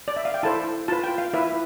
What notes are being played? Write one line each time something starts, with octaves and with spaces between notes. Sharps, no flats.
D5
E5
F5
G5
E4 A4 C5 A5
F4 B4 A5
G5
F5
E4 B4 E5